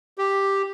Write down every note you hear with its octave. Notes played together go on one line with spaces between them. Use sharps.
G4